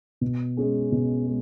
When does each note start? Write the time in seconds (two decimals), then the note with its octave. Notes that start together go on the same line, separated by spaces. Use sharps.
0.21 B2
0.57 G#3 C#4 G#4
0.92 B2
1.27 G#3